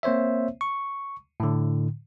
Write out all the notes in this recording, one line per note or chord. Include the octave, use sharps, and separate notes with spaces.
A#3 C4 C5 C#5 E5
C#6
A2 D3